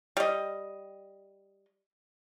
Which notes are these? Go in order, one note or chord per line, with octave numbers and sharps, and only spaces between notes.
G3 D#5